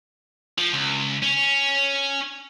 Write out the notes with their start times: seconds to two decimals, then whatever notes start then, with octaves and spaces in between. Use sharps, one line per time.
0.58 F3
0.73 C#2
1.23 C#4